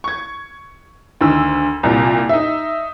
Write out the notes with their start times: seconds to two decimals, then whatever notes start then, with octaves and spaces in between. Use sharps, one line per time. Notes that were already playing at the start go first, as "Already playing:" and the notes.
0.04 C#6 G#6
1.21 D2 D#3 E6
1.83 C2 A#2
2.29 D#4 E5